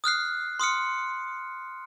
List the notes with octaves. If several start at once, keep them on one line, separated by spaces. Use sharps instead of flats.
D#6 F6 F#6 C7
C6 D#6 F6 C#7